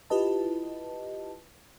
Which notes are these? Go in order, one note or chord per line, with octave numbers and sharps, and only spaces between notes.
E4 F4 G4 B4 D#5 A5